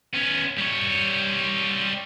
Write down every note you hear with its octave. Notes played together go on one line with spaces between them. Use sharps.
B3 C#4
G3 C#5